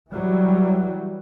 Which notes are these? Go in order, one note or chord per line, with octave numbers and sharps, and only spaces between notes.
E3 F#3 G3